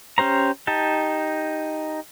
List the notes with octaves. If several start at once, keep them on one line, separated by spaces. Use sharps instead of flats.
C#4 G4 C5 A#5
D#4 G4 A5